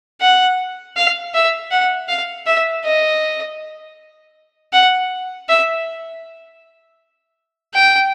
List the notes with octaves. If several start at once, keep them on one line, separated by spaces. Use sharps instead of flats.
F#5
F5
E5
F#5
F5
E5
D#5
F#5
E5
G5